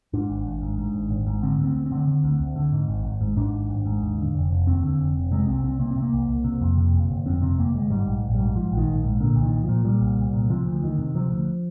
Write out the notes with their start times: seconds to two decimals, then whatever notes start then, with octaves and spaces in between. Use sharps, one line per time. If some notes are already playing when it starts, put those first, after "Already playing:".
0.13 G#2 D4
0.30 G#1
0.45 G#1
0.62 G#2
0.78 G#2
0.94 G#1
1.10 G#1
1.27 G#2
1.43 D3 C4
1.59 D2 C4
1.75 D2
1.86 C4
1.92 D3
2.08 D3
2.24 D2
2.40 D2
2.56 D3
2.72 G#2
2.88 G#1
3.05 G#1
3.21 G#2
3.37 G#2 D4
3.53 G#1
3.69 G#1
3.85 G#2
4.02 D#2
4.18 D3
4.35 F1
4.51 F1
4.66 D#2 C4
4.83 D3
4.99 F1
5.15 F1
5.32 C3 G#3
5.47 C2 C4
5.64 C2 C4
5.79 C3 A#3
5.91 C4
5.96 C3
6.02 A#3
6.13 C2
6.29 C2
6.44 C3
6.61 F2
6.77 C3
6.93 G1
7.10 G1
7.26 F2 C4
7.42 C3 C4
7.58 G1 A#3
7.74 G1 G#3
7.90 G#2 G3
8.07 A#1
8.23 A#1
8.34 G#2 G3
8.55 G#2 F3
8.72 A#1
8.77 D#3
8.88 A#1
9.04 G#2
9.20 A#2 D3
9.36 C2
9.42 D#3
9.53 C2
9.64 A#2 F3
9.85 A#2 G3
10.01 C2
10.18 C2
10.33 A#2
10.50 C3 F3
10.66 D2
10.83 D2 D#3
10.99 C3
11.15 C3 F3
11.31 D2